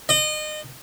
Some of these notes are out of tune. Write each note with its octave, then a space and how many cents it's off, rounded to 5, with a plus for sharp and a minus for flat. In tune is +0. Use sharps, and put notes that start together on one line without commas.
D#5 -30